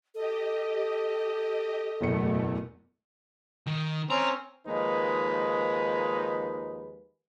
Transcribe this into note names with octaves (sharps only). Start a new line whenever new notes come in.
G4 A4 D#5
F#1 E2 B2 A3 C#7
D#3
C4 C#4 A#5
D#2 F3 G#3 A#3 D#4 B4